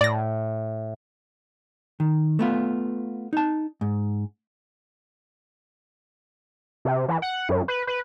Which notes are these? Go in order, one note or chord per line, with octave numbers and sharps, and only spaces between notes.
A2 D5 A#6
D#3
A3 B3 F4
D#4 A5
G#2
C3
E3
F#5
F#2
B4
B4